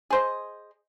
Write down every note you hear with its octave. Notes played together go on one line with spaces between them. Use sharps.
G#4 C5 D#5